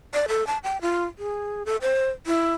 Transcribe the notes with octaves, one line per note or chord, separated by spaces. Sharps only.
D5
A4
A5
G5
F4
G#4
A4
C5
E4